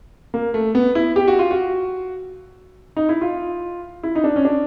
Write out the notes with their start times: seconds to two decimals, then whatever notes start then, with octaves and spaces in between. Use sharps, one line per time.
0.34 A#3
0.54 A3
0.75 B3
0.95 E4
1.16 G4
1.28 F#4
1.39 F4
1.51 F#4
2.96 D#4
3.09 E4
3.21 F4
4.03 E4
4.15 D#4
4.24 D4
4.36 C#4
4.45 D4